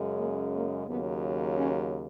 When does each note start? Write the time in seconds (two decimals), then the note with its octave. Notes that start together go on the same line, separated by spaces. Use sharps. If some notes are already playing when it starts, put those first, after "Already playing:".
Already playing: F#2 C#3 G#3
0.16 A#3
0.52 A#3
0.87 D#2 C#3 F#3 B3
1.57 C#4